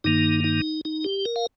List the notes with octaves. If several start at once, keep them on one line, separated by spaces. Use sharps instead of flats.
G2 D#3 A#3 D#4
D#4
D#4
G4
A#4
F5